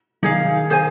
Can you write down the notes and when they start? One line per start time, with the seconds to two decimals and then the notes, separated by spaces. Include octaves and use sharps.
0.23 D#3 D#4 G#4 F5
0.70 G#4 C5 G#5